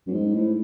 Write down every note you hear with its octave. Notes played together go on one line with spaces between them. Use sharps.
F#2
G#2
A2